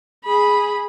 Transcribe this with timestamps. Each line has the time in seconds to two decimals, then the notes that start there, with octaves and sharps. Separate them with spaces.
0.24 G#4 B5